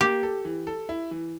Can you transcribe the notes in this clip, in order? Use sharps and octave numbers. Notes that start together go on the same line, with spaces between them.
A#3 G4
A4
E3
A4
E4
E3